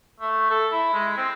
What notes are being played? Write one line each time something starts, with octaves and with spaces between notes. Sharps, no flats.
A3
A4
E4
G#3
C4